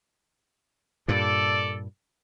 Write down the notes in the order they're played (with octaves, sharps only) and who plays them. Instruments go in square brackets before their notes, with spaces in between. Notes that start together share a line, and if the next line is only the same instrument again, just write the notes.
[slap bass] G2 A#2 [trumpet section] A4 D5